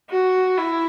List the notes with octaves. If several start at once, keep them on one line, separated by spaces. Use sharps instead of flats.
F#4
E4